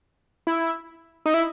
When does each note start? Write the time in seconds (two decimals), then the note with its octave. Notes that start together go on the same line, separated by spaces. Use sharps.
0.47 E4
1.26 D#4
1.34 E4